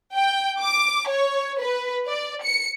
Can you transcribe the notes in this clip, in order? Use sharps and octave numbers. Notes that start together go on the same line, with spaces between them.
G5
D6
C#5
B4
D5
C#7